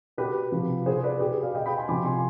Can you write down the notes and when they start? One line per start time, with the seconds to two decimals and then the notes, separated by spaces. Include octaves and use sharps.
0.18 B2 G4 B4
0.52 C3 F3
0.86 B2 G#4 C5
1.03 B4 D5
1.14 G#4
1.20 B2 G4
1.32 G#4
1.43 D5 F5
1.54 B2 D#5 G5
1.66 G5 B5
1.77 G#5 C6
1.88 C3 F3 B5 D6
2.05 G#5 C6